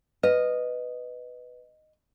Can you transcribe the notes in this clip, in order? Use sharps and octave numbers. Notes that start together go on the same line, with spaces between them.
B4 D#5